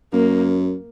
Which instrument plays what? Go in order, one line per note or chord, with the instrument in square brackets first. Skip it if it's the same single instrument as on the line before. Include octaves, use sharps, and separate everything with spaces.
[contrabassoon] F#2 [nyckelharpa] A#3